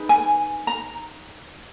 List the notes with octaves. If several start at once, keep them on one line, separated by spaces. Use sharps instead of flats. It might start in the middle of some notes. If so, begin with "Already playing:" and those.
Already playing: D#4 G#4 B4
G#5
A#5